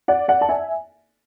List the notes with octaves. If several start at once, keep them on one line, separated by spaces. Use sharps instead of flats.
D5 F#5
D5 F#5
A5
E5 G#5